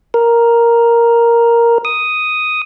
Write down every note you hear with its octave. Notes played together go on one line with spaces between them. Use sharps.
A#4
D#6